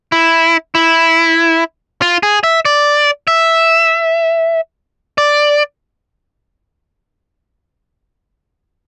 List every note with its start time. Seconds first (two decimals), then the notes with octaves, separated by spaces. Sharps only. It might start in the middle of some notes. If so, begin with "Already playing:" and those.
0.12 E4
0.75 E4
2.02 F4
2.23 G#4
2.44 E5
2.65 D5
3.28 E5
5.18 D5